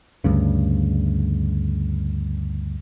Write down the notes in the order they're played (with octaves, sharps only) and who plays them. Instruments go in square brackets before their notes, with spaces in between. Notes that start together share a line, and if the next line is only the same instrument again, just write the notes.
[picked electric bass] D2 G2 C#3